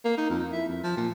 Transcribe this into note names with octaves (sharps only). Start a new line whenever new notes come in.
A#3
D#4
F2
E4
F2
F3
A#2